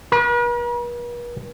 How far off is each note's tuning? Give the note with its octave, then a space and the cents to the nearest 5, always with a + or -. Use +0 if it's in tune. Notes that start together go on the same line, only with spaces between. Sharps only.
B4 -45